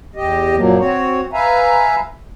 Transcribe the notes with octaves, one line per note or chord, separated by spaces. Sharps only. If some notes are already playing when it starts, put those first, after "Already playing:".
E2 G4 D#5
F#2 A#2 F3 F#3 A#3
C4 F#4 C#5
B4 E5 F5 G#5 A#5